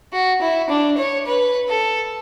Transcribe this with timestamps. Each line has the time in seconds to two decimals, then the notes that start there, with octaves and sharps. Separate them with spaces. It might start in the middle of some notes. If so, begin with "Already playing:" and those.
0.13 F#4
0.41 E4
0.69 D4
0.97 C#5
1.26 B4
1.68 A4